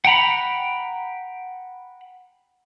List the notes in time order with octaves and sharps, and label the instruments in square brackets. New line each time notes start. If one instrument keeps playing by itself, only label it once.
[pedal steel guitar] F#5 G5 A#5 B5